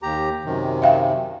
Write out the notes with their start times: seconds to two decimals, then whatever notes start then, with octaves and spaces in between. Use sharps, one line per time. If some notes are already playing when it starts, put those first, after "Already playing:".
0.02 D#2 G4 A#5
0.45 F#2 C3 D#3
0.82 E5 F5 G5